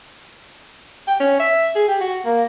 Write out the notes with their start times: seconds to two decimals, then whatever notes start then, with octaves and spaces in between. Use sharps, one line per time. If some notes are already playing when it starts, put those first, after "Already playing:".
1.07 G5
1.20 C#4
1.40 E5
1.76 G#4
1.88 G4
2.01 F#4
2.25 A#3